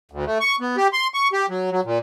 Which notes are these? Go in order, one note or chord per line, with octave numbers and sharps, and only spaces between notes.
D2
A3
C#6
B3
G4
C6
C#6
G4
F#3
F#3
A#2